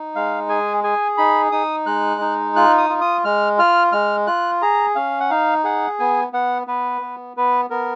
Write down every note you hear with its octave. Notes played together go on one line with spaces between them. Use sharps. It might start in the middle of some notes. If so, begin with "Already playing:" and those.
Already playing: D#4
G#3 F5
G#4 G#5
G#4 G#5
D#4 B5
D#4 D#6
G#3 F#6
D#4
F4 F#6
D#6
F4
D#6
G#3 F6
F4 F6
G#3 F6
F4 F#6
G#4 A#5
C#4 F5
F#5
D#4 F5
G#4 F#5
B3 G#5
B3 F#5
B3 B4
B3
B3 B4
B3 A#4